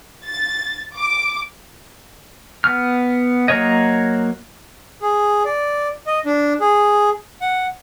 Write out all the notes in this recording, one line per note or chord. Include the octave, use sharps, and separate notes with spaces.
A6
D6
B3 F6
F#3 A#3 A#4 C#5 D#5
G#4
D5
D#5
D4
G#4
F#5